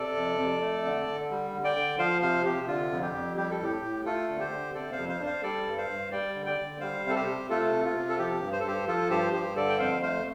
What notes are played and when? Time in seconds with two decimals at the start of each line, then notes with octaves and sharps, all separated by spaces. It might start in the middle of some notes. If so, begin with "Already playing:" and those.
Already playing: C3 A4 D5
0.16 F2
0.39 F2
0.61 A3
0.85 D3
1.07 D3
1.31 G3
1.54 D3
1.64 D5 G5
1.76 D3
1.98 F3 C5 F5
2.21 C3 C5 F5
2.45 C3 G4
2.67 D3 F4
2.91 F2
3.02 G4
3.14 F2
3.37 G3 G4
3.51 A4
3.60 A2 G4
3.82 A2
4.05 A3 F4 A4
4.29 D3
4.39 G4 C5
4.52 D3
4.75 C3 A4 D5
4.92 C5 F5
4.97 F2
5.09 C5 F5
5.20 D4
5.25 C5 F5
5.43 G3 A4 D5
5.67 G2
5.78 C5 F5
5.89 G2
6.12 G3 D5 G5
6.34 D3
6.46 D5 G5
6.59 D3
6.80 G3 C5 F5
7.03 C3
7.10 A4
7.15 G4 C5
7.26 C3
7.50 A3 F4 A4
7.72 C3
7.85 F4
7.96 C3
8.09 A4
8.18 F3 G4
8.42 G2
8.52 C5
8.60 A4
8.65 G2 G4 C5
8.87 F3 F4 A4
9.10 G2 G4 C5
9.33 G2 G4 C5
9.56 D3 A4 D5
9.69 G5
9.79 F2 C5 F5
10.02 A3 C5 F5